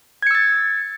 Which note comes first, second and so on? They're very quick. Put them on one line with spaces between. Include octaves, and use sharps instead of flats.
G#6 C#7 E6 A6